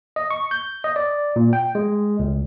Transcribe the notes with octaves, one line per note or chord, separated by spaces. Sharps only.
D#5
C#6
G6
D#5
D5
A#2
G5
G#3
C#2